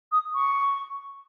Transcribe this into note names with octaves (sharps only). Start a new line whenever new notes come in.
D#6
C#6